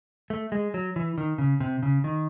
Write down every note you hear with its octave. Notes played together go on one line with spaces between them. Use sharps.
A3
G#3
F#3
E3
D#3
C#3
C3
C#3
D#3